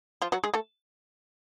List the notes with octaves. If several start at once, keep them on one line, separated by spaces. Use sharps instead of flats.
F3 F4
F#3 F#4
G#3 G#4
A3 A4